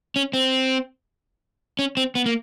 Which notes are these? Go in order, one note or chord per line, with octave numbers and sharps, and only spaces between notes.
C#4
C4
C#4
C4
B3
A#3